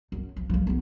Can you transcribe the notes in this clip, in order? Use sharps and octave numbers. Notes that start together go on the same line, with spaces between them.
F#2
F3
F3 G3
B3 D#4